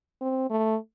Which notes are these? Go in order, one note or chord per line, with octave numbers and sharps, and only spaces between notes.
C4
A3